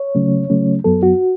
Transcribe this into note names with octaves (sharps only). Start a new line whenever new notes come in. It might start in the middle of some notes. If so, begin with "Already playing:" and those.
Already playing: C#5
C#3 F#3 A3 C#4
C#3 F#3 A3 C#4
F#2 F#3 B3 A4
F#4